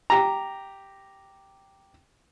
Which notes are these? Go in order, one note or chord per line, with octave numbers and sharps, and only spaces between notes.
G4 A#5